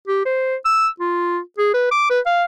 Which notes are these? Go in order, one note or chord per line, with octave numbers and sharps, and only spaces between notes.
G4
C5
E6
F4
G#4
B4
D6
B4
F5